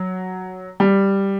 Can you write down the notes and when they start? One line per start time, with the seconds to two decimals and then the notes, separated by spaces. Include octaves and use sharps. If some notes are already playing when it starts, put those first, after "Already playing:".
Already playing: F#3
0.80 G3